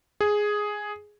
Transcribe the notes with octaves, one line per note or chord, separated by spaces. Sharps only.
G#4